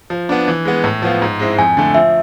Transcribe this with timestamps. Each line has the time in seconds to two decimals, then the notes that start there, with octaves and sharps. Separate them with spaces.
0.10 F3
0.29 B3 D4
0.48 E3
0.65 G#3 B3
0.84 A2
1.02 F3 B3 F4
1.22 G#2
1.39 G#3 C4 E4
1.59 F2 G#5
1.77 D3 A3
1.95 F3 E5